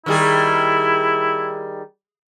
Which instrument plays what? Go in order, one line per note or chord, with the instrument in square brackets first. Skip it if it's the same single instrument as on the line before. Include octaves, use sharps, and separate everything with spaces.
[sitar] D#3 G3 G#4 [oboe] E4